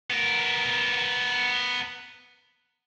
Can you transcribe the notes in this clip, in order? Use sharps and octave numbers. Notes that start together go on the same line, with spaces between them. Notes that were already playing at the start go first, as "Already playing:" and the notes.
B3 A#4